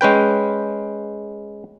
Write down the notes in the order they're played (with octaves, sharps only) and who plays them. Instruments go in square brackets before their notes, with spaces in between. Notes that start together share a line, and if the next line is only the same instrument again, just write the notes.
[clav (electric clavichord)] G#3 C#4 B4 G5